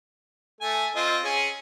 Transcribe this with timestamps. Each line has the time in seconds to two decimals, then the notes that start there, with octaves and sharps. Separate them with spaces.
0.61 A3 G#5
0.96 C4 F4 D#5
1.24 C#4 G#4